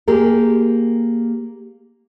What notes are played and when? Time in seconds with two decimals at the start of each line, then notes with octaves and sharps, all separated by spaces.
0.08 A#3 G4 G#4 A#4